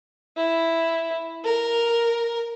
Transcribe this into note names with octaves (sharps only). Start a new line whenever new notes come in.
E4
A#4